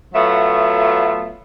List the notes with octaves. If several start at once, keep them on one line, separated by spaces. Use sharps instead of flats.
F#3 A3 B3 F4 E5